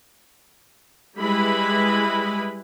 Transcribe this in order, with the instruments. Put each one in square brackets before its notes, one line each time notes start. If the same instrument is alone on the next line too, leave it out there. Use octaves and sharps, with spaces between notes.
[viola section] G3 G#3 E4 B4 B5